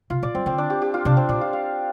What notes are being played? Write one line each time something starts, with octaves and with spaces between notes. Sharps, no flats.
C3 F4
A#2 D5
G3 C4
D3 C4
D4
G4
G4
F4
C3 D4
C4
A#2 D4
F4
F5